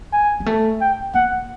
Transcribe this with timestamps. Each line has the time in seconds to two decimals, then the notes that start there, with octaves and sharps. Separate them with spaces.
0.13 G#5
0.40 G#3
0.46 A3
0.81 G5
1.14 A#3 F#5